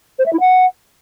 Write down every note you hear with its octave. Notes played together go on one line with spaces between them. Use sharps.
C5
E5
E4
F#5